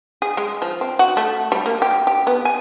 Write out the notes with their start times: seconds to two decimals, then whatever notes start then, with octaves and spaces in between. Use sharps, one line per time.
0.22 G#4
0.37 G#3
0.62 F3
0.81 C4
0.99 F#4
1.17 A3
1.52 G3
1.66 A#3
1.82 G4
2.07 G4
2.27 B3
2.45 G#5